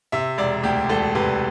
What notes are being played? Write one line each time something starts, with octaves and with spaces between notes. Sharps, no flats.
C3 E5
E1 D5
D2 G4
E1 A4
C3 B4